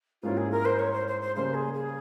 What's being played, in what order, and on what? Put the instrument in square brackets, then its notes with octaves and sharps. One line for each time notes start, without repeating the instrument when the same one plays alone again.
[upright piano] G#2 G3 A#3 C#4 E4 [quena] F4
[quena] G#4
A#4
C5
C#5
C5
C5
C5
[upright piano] C#3 G3 A#3 [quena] C5
[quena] G#4
G#4